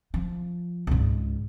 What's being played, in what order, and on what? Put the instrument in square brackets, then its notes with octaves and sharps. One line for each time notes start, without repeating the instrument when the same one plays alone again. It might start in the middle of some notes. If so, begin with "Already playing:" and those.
[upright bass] F3
C#2 G#2